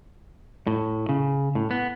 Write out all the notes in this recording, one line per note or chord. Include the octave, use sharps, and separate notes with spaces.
A2
C#3
A2
B3